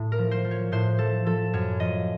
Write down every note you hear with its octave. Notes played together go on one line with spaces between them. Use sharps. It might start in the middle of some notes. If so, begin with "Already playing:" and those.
Already playing: A2
A#4
F3
C5
F3
C#5
A2 C5
F3 A4
F3 A4
F#2 C#5
F3 D#5